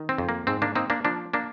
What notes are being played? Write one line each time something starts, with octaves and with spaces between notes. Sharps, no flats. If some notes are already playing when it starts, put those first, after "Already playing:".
Already playing: D#3
C4
F2
A#3
G#2 C4
A#3 D4
A#3 C4 D#4
A#3 D4
F3 A#3 D4
A#3 D4